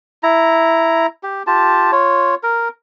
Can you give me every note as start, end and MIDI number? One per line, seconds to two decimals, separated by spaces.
0.23 1.07 64
0.23 1.07 82
1.23 1.43 67
1.47 1.91 65
1.47 1.91 67
1.47 1.91 81
1.92 2.35 65
1.92 2.35 73
2.43 2.68 70